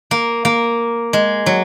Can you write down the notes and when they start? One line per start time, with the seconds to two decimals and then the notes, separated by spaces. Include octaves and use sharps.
0.11 A#3
0.45 A#3
1.13 G#3
1.46 F#3